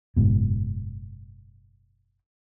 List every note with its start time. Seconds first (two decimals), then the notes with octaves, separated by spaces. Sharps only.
0.17 F#1 G#2 B2